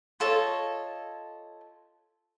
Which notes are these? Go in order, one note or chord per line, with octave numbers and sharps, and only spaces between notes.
F4 A4 C#5 D#5